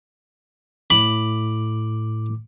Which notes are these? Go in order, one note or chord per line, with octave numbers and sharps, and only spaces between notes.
A2 B5 D6